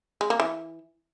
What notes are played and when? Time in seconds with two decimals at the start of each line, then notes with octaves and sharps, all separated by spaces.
0.21 G#3
0.30 A#3
0.40 E3